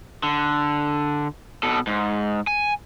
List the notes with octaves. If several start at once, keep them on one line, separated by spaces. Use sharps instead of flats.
D3
B2 A4
G#2
G#5